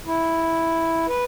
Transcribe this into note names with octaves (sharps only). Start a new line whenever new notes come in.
E4
B4